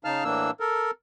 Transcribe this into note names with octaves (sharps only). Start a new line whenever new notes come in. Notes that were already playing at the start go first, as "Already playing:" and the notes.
C#3 D#4 F5 A5 F6
A2 E3 A#3 D4 E6
A4 A#4